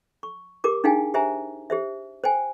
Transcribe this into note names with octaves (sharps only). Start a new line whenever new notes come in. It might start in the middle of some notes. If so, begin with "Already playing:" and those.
C#6
G4 A#4 D6
D4 D#4 G#4 F5 G5 G#5
G4 C5 E5 G#5 A#5
G4 C5 E5
C5 G5 G#5